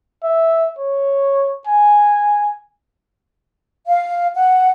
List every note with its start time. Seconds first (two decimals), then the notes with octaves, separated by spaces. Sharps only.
0.24 E5
0.78 C#5
1.67 G#5
3.88 F5
4.36 F#5